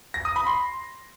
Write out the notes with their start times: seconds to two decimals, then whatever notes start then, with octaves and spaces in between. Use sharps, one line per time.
0.14 A#6
0.25 D#6
0.36 B5
0.47 C6